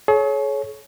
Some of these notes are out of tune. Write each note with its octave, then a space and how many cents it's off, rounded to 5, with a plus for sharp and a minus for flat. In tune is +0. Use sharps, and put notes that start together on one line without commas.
G#4 +45 C#5 +0